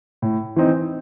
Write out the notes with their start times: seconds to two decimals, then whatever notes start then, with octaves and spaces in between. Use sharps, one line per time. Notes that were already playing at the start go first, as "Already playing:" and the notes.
0.22 A2
0.56 E3 C4 D#4